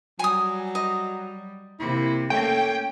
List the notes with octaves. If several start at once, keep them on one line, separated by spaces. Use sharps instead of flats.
F#3 G3 G#5 D#6
D#5
C3 A#3 E4
A3 A#3 C#4 G5